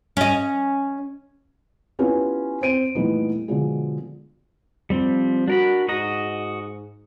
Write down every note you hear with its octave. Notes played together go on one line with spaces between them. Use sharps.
C#4 D#5
B3 C#4 E4 F4 G4 B4
C4 C5 D7 D#7
A#2 E3 G3 A3 B3 D#4
B2 D3 F3 G#3
F3 G3 C4
D4 F#4 A#4 B5
G#2 F#4 D#5 A#5